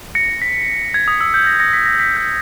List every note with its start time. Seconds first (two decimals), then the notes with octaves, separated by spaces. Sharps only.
0.15 A#6 C#7
0.42 B6
0.94 G#6
1.08 D#6
1.21 E6
1.34 G6
1.47 A#6
1.59 A#6 C#7
1.73 B6
1.86 A#6
2.00 B6
2.17 G6